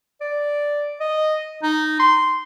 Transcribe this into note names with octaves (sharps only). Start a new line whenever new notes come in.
D5
D#5
D#4
C6